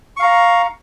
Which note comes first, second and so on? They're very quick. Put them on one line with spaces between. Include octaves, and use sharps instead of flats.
C#6 F5 A#5